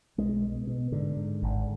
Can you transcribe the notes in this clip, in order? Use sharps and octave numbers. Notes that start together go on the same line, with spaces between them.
B1 G#3
B2
B2
G#2 D3
G#2
G#1